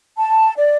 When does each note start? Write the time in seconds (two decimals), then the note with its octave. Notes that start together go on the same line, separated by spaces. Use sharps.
0.18 A5
0.56 D5